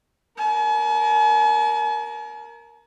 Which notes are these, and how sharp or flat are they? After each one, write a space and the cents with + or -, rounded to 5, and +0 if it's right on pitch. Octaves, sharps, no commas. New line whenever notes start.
A#4 +0 G#5 +45